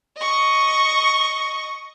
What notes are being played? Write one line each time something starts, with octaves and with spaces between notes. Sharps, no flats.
D#5 C#6